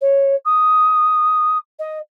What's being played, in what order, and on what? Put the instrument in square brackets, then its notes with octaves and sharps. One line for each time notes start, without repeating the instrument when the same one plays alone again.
[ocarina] C#5
D#6
D#5